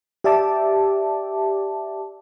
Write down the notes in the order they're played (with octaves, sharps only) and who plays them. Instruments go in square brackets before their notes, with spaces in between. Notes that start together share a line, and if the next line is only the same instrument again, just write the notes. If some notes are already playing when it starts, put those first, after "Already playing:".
[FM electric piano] G4 D5 E5 G5 A5 D6